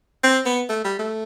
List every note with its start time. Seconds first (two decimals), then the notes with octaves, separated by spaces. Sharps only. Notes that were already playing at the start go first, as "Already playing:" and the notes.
0.24 C4
0.46 B3
0.69 A3
0.84 G3
0.99 A3